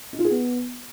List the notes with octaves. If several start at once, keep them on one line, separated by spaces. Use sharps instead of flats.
D#4
F4
G#4
B3